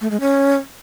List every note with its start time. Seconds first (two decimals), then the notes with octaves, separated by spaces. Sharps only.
0.01 A3
0.11 G#3
0.20 C#4